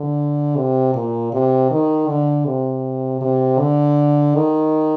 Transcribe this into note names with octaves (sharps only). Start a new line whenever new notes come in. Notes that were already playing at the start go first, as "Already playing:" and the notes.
Already playing: D3
C3
A#2
C3
D#3
D3
C3
C3
D3
D#3